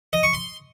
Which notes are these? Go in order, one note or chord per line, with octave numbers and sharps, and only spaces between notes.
D#5
C#6
C6